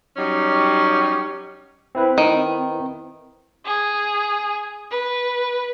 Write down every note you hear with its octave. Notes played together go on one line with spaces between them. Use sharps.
F#3 G3 C#4 D#4 G4
C4 E4 B4
D#3
G#4
B4